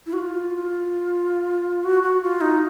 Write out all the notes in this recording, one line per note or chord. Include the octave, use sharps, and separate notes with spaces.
E4
F#4
F4
F#4
F#4
F4
D#4